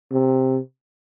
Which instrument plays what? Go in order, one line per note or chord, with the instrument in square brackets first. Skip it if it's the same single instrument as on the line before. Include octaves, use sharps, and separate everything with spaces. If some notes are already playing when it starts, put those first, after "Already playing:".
[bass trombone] C3